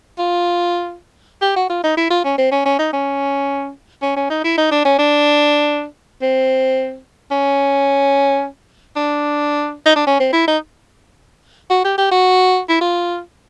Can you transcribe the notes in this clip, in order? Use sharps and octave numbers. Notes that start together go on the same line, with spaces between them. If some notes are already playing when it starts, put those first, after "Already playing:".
F4
G4
F#4
F4
D#4
E4
F4
C#4
C4
C#4
C#4
D#4
C#4
C#4
C#4
D#4
E4
D#4
D4
C#4
D4
C4
C#4
D4
D#4
D4
C#4
C4
E4
D#4
F#4
G4
G4
F#4
E4
F4